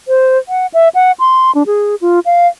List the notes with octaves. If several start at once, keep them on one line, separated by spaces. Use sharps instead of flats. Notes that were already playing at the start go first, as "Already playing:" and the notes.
C5
F#5
E5
F#5
C6
D4
G#4
F4
F5